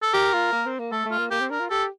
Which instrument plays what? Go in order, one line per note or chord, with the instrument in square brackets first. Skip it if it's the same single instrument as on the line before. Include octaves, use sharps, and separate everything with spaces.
[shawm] A4
[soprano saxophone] G4 [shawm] A#4
[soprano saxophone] F4
A#3
C4
A#3
[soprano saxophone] A3 [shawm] A4
[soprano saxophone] A3
[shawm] F4
[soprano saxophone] A#3
[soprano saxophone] A#3 [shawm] G4
[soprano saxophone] C4
[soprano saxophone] D4 [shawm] A#4
[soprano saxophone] F4
[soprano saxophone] G4 [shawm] A4